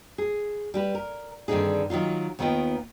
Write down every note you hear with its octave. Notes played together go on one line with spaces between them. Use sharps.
G#4
G3 G4 B4
A#4
G2 D3 D#3 C4 D#4 G#4
D#3 F#3 D#4 F4
D#2 D#3 B3 F4 D#5 G5